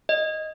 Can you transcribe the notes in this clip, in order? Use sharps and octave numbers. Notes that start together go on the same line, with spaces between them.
D#5